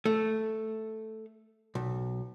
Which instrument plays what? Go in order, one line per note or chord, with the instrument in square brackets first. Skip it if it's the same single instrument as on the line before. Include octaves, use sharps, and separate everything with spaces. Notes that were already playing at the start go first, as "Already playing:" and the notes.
[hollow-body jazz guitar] A3
B1